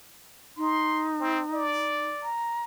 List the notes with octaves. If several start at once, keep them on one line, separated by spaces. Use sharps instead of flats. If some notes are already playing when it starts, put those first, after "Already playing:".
D#4 C6
C4
D5
A#5